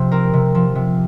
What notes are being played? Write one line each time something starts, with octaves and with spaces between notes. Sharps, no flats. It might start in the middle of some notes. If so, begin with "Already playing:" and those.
Already playing: C3 F3 C5
C4 A#4
C3
F3
C3